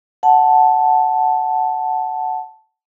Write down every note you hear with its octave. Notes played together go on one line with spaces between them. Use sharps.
F#5 A5